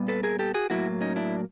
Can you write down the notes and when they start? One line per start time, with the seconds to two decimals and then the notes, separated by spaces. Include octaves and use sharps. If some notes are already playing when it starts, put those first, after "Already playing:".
Already playing: A#2 G3 B3
0.08 A4 B4
0.23 G#4 A#4
0.39 G4 A4
0.54 F#4 G#4
0.70 A2 F#3 A#3 E4 F#4
1.01 C#4 D#4
1.16 D4 E4